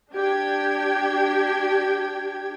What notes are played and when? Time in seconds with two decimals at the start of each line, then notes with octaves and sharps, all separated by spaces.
0.14 D4 G4 G5 G#6